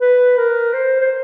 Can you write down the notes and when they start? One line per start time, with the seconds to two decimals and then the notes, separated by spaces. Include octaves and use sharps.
0.01 B4
0.37 A#4
0.73 C5
1.01 C5